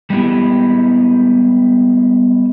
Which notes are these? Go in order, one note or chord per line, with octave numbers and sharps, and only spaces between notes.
G3 G#3 B3 E4 G4